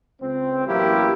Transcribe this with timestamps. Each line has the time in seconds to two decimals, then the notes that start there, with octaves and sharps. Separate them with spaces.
0.21 C#2 C4
0.66 A1 F#3 A#3 E4 G4